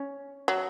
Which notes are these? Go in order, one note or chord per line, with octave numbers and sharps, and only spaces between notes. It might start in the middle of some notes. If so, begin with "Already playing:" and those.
Already playing: C#4
F#3